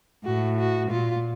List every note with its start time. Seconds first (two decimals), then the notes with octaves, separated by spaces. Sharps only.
0.25 A2 F#4
0.59 F#4
0.91 A#2 F4